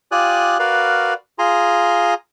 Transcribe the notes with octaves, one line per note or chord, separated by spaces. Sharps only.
F4 G4 D5 G#5 D#6 F#6
F#4 A#4 B4 D5 F5
F4 G#4 G#5 A#5 C6